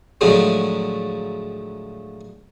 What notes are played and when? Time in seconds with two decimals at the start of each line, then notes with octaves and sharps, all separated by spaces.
0.21 A2 D3 F3 F#3 G#3 A3